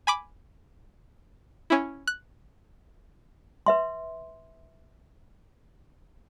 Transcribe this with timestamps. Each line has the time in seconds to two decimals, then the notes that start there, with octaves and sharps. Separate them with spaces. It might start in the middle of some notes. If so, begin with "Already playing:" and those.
0.07 G#5 B5 D6
1.70 C#4 E4
2.07 F#6
3.66 B4 E5 C6